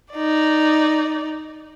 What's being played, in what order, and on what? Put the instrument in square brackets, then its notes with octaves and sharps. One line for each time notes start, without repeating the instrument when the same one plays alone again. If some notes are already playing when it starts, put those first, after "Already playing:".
[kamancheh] D#4 D5